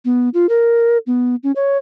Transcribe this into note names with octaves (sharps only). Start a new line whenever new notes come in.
B3
F4
A#4
B3
C#4
C#5